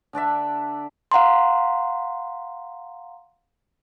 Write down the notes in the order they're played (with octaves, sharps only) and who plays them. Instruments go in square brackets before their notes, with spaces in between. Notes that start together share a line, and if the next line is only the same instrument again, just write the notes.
[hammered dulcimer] D3 D4 D5 E5
[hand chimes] F5 F#5 A#5 C6